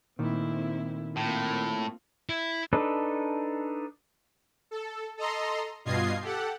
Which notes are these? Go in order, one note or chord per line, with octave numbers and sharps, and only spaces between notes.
A#2 D#3 A3 C4 E4
A2 A#3 C4 F4
E4
D4 D#4 A4 B4
A4
A4 D#5 A#5 C6
G2 B2 F4 D#5 G#6 C7
G4 A4 F#5